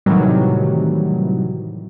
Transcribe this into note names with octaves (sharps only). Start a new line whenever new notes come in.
A2 C3 D#3 E3 F#3 G3